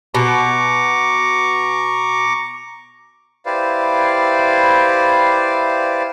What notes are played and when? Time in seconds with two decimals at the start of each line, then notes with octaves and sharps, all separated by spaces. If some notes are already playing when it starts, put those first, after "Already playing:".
0.15 B2 A#5 C#6 D6
3.46 E4 G4 B4 C5 D5 F5